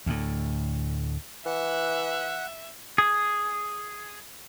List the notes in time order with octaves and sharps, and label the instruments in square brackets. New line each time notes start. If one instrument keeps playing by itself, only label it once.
[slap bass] D2 A2
[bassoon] E3 [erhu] E5 [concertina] F#5 F#6
[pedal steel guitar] G#4